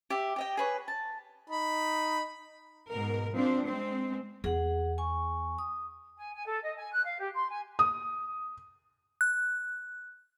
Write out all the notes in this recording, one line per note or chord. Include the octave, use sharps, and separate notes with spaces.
G4 E5
G4 D#5 G5
G#4 B4 C#5
A5
D#4 B5
G#2 B2 A#4
F3 C4 D4 C5
G#3 C4
E2 G#4 F#5
G#5 C#6
D#6
G#5
G#5
A4
D#5
G#5
F#6
F5
G4
C6
G#5
D#6
F#6